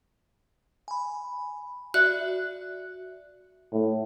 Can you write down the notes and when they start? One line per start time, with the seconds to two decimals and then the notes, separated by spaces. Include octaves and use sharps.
0.88 G#5 B5
1.94 F#4 D5 E5 F#6
3.72 A2